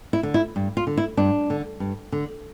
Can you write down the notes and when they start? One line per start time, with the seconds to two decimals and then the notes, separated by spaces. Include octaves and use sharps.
0.13 E4
0.23 D3
0.34 E4
0.56 G2
0.77 F4
0.87 D3
0.97 E4
1.17 G2 D4
1.50 D3
1.80 G2
2.12 D3